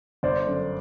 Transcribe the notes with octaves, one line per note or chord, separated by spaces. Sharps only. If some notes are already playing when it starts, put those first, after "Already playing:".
G1 C5 D5
F#2 D3